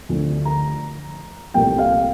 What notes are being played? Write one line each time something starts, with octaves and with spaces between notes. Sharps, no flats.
D2 D3 F3
A#5
C2 A#2 F3 A3 G5
F5